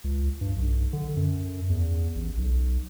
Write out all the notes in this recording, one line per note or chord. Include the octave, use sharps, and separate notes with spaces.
C#2
G2
B1
D3
F#2
E2
A1
B1